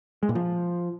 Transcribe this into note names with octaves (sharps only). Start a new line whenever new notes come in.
G#3
A#2
F3